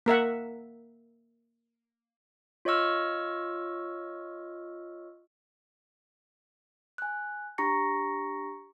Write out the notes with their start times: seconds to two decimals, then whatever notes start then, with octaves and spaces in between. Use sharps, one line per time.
0.06 A#3 A#4 E5 F#5
2.65 F4 C#5 D#5 C#6 E6 F6
6.98 G#5 F#6
7.58 D4 G4 A#5 C#6 A#6 C#7